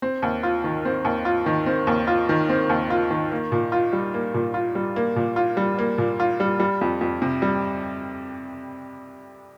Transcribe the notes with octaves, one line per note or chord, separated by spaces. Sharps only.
C4
D#2
F4
D#3
C4
D#2
F4
D#3
C4
D#2
F4
D#3
C4
D#2
F4
D#3
A#3
A#2
F4
G3
A#3
A#2
F4
G3
A#3
A#2
F4
G3
A#3
A#2
F4
G3
G3
F2
F2
C3
G3